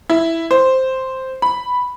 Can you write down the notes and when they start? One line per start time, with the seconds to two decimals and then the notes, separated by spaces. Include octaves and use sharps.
0.10 E4
0.51 C5
1.42 B5